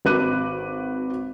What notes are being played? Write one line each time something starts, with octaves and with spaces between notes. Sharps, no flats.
G#1 F#4 B4 D6 F#6 D#7